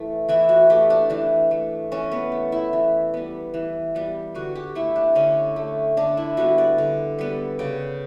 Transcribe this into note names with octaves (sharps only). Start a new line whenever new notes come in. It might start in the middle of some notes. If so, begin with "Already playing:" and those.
Already playing: E3 A3
E3 E4
F#4
A3 G4
D4
E3 D4
A3
E3 C#4
B3
A3
E4
E3
G3 B3
E3
G3 B3
D3 F#4
G4
A3 E4
D4
D3 C#4
A3
D3 D4
E4
G3 B3 F#4
D5
D3
G3 B3
C#3 G5